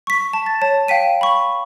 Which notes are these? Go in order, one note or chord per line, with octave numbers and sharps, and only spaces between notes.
C#6 B6
A5
A6
C#5 A5
F5 G5 B6 D#7
B5 C#6